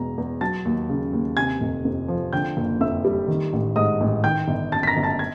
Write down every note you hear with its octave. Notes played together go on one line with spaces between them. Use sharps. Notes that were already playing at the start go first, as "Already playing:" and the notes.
Already playing: E2 B2 G#3 A#5
E2
F#3 A5 A6
D#2
C#3
D#2
C3 G#5 G#6
F1
F2
F3
D3 G5 G6
F#1
F2 E5 E6
G3
D#3
A1
G#2 D#5 D#6
A1
D#3 G5 G6
G1
F#2 A5 A6
B6
A#5 A#6
G1
A5 A6
G#6